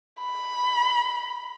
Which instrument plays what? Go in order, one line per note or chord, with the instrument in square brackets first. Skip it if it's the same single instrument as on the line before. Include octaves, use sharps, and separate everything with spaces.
[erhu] B5